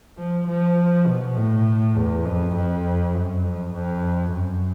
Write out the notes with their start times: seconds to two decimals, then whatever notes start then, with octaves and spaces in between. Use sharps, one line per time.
0.18 F3
0.47 F3
1.07 B2
1.36 A2
1.96 E2
2.25 F2
2.56 F2
3.15 F#2
3.44 F2
3.74 F2
4.33 F#2